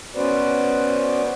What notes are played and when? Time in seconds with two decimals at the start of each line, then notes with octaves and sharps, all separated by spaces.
0.15 B3 C#4 F#4 B4 C5 D5